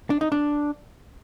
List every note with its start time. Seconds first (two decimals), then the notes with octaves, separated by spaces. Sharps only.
0.10 D4
0.21 D#4
0.32 D4